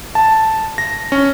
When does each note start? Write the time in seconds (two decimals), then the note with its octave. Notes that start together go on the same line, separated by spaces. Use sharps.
0.15 A5
0.78 A#6
1.12 C#4